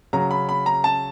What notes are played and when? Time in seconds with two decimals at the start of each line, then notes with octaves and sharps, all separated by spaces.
0.13 C#3 F#3 A#5
0.31 B5
0.49 B5
0.66 A#5
0.84 A5